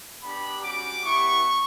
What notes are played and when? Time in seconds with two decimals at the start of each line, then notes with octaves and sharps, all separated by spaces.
0.23 B3 D4 G4 B5
0.63 G3 C#4 F#4 D6
1.04 B3 E4 G4 C#6